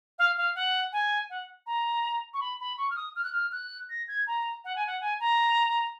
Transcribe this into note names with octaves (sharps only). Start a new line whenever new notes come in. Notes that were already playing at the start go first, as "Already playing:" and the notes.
F5
F5
F#5
G#5
F#5
A#5
C#6
B5
B5
C#6
F6
D#6
F6
F#6
F6
F#6
A#6
G#6
A#5
F#5
G#5
F#5
G#5
A#5